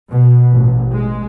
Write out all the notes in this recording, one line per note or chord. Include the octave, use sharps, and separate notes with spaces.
B2
A1
G#3